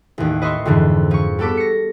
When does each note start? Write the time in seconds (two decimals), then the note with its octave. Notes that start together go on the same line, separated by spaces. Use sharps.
0.18 A1 D#2
0.42 B4 D#5 E5 C6 C#6
0.65 F2 G#2 D3 E3
1.11 F3 C#6
1.39 G3 B3 A4 D6 B6
1.57 A#6 C#7